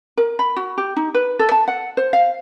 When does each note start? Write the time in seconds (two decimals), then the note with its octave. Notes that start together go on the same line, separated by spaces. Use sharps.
0.17 A#4
0.39 B5
0.56 F#4
0.78 G4
0.96 D#4
1.14 B4
1.39 A4
1.52 A5
1.68 F#5
1.97 C5
2.13 F5